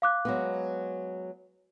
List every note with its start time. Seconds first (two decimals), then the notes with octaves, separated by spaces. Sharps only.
0.02 F5 D6 F#6
0.25 F#3 G#3 B3